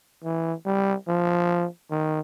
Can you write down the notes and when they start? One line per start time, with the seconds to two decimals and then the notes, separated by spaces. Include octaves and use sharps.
0.24 E3
0.66 G3
1.08 F3
1.91 D#3